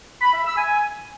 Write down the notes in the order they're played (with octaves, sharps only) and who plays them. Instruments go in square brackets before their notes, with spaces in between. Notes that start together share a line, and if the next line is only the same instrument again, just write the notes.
[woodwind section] B5
E5
E6
G#5